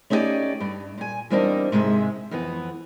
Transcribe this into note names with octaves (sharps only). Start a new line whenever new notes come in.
A3 C#4 D#4 E4 G4 D5
G2
A#2 G#5
E2 G3 A#3 C4 D4 D#4
G#2 C3 G#3 E5
F2 E3 B3